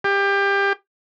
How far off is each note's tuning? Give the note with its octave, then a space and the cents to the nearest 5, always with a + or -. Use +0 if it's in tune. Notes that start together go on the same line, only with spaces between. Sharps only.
G4 +25